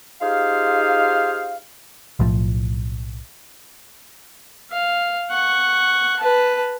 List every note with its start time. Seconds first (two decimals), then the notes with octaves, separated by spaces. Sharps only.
0.21 D#4 F4 G4 G#4 C5 F5
2.20 B1 A2 F3
4.71 F5
5.30 F#5 C#6
6.20 B4 A5